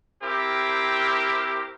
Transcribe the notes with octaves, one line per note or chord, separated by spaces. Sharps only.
C4 E4 G4 A#4